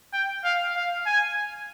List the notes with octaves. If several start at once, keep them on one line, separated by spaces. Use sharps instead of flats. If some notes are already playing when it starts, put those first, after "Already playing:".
G5
F5
F5
G#5